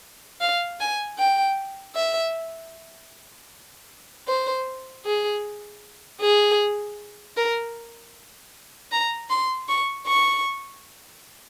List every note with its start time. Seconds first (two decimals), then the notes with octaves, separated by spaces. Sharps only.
0.41 F5
0.80 G#5
1.19 G5
1.95 E5
4.27 C5
5.05 G#4
6.21 G#4
7.36 A#4
8.91 A#5
9.30 C6
9.68 C#6
10.07 C#6